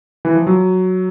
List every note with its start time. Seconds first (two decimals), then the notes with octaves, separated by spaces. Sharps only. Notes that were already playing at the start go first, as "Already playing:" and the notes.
0.25 E3
0.35 F3
0.47 F#3